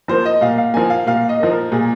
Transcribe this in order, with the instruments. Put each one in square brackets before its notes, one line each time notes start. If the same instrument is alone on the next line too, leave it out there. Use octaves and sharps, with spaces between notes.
[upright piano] F3 A#3 C5
D#5
A#2 F5
F5
F3 A#3 G#5
F5
A#2 F5
D#5
F3 A#3
A#4
A#2 G#4